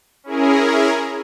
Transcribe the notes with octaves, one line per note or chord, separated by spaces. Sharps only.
C#4 E4 G#4 A#4